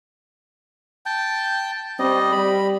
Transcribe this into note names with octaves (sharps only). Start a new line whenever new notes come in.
G5 A5
G3 C4 D#5
G3 B5